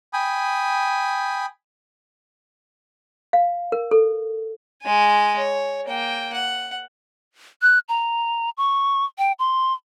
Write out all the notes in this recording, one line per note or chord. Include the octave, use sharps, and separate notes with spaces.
G5 G#5 B5 D#6
F5
A#4
A4
G#3 G#5
C#5
A#3 G5
F#5
F#6
A#5
C#6
G5
C6